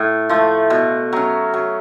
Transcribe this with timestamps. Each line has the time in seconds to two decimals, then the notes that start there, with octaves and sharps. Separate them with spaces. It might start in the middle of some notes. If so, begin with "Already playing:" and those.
Already playing: A2
0.29 F3 A3
0.70 B2
1.13 F#3 C#4
1.54 F#3